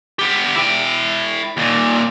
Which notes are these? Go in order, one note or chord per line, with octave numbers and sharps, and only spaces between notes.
B3 G4
E4 G5
D#2 A#2